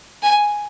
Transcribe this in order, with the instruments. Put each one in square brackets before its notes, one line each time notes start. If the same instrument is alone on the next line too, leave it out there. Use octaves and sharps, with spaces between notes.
[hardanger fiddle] G#5